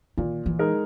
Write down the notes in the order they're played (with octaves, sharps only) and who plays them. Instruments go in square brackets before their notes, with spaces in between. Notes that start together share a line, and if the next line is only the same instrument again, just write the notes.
[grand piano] A#2 [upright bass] D#3
[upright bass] E3
[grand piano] G#3 D#4 A#4